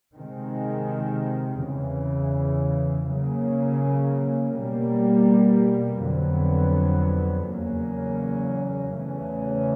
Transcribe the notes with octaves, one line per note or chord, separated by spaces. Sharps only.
C3 D#3 G#3 C4
E2 C#3 E3
C#3 F#3 A#3 C#4
B2 G3 A#3
F2 D3 F#3 B3
E2 C#3 F#3 A#3 C#4
E2 C#3 E3 A3 C#4